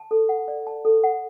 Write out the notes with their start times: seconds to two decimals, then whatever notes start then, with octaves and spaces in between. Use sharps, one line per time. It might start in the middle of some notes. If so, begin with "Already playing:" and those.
Already playing: A5
0.11 A4
0.29 F#5
0.48 D5
0.67 A5
0.85 A4
1.04 F#5